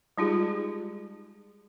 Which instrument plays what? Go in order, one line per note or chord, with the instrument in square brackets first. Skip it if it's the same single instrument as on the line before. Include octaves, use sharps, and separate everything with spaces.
[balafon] G3 G#3 D#4 F4 G4 G#4